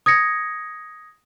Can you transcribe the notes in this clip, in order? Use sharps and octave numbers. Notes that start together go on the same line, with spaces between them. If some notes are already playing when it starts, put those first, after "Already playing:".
D#6 G#6 A#6 C#7